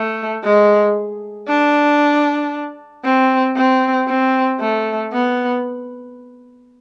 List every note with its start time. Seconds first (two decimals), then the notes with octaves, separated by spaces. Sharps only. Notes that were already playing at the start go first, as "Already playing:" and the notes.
Already playing: A3
0.44 G#3
1.48 D4
3.04 C4
3.56 C4
4.08 C4
4.60 A3
5.13 B3